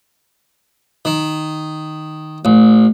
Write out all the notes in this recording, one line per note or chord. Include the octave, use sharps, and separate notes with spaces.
D#3
A1